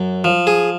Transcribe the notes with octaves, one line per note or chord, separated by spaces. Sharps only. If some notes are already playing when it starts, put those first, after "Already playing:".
Already playing: F#2
F3
G#4